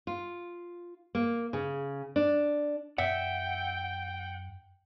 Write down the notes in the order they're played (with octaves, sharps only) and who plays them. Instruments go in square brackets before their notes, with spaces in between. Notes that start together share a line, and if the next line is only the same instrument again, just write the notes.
[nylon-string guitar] F4
A#3
C#3
D4
[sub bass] F#2 [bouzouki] E5 [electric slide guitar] F#5 [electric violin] G5